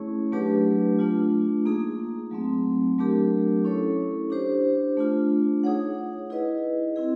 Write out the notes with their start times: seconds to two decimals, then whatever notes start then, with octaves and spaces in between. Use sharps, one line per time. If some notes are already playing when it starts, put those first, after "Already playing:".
Already playing: A3 C#4 E4 G#4 C#5
0.32 F#3 A3 D4 G4 B4
0.99 A3 D4 F4
1.65 A#3 D#4 G#4
2.31 F#3 A3 C4
2.98 F#3 A3 D4 G4 A#4
3.65 C#4 E4 A4 C#5
4.30 D4 G4 C5
4.97 A3 D4 F4
5.64 D#4 G#4 C#5 F#5
6.30 E4 G#4 B4 D#5
6.96 C4 E4 G#4